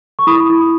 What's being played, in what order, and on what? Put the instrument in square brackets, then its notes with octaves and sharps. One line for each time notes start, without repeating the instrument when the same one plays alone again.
[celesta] C#6
E4 B5 D#6
E4